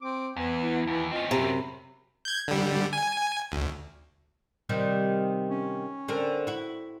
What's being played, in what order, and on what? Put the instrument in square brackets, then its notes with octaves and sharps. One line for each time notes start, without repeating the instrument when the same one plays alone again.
[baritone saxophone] C4 [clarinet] D6
[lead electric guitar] E2 [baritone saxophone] B3 [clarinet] G#5
[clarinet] E4
[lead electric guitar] D#2 [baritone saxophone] E3
[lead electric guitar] C4 C#4 [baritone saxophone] F4 [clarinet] D#5
[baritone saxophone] F#2 [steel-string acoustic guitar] C3 [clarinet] B5
[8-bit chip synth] G6 G#6
D3 G3
G#5
D2
[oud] C3 D#3 G3
[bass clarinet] C#4
[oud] D3 C4 A#4
E4 F#4